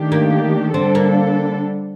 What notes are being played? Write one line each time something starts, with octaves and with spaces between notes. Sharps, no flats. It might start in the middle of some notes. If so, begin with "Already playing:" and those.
Already playing: D#3 A3 D4 G4
A#3
D3 G3 C4 D4 A4
A#3